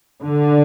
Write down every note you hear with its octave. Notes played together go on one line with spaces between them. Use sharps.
D3